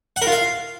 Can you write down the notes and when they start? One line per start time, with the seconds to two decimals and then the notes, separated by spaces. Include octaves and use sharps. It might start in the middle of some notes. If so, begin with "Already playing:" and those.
0.16 F#5
0.22 A#4
0.27 F4
0.32 F5